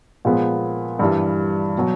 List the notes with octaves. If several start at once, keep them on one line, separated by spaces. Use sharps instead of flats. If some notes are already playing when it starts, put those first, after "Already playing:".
A#2 F3 G#3 B3
G2 E3 G3
B2 F#3